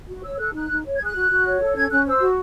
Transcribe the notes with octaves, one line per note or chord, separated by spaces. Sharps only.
F#4
C#5 E6
A4 F#6
D#4 F#6
D#4
C#5
G#6
G#4 F#6
F#4
F#4
C#5
A4
C#4 G#6
C#4 F#6
C5 E6
F#4